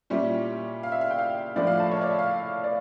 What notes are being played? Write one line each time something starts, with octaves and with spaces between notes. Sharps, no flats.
A#2 G3 C#4 E4
F5
E5
F5
G5
F5
A2 F3 A3 D4 D5
F5
A5
C#5
D5
E5
F5
D5